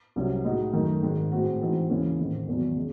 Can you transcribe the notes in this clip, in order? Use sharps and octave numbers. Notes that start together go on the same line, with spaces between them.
C2 C3 F#3 C#4
A2 G#3 D#4 F#4
F#2 D#3 A3 D#4
G#1 G#2 D#3 G#3
A2 G#3 C4 F#4
G#2 E3 C4 D#4 F#4
D#2 C#3 E3 G#3 C#4
A1 G#2 D#3 A3 C4
E2 D#3 F#3
C#3 G#3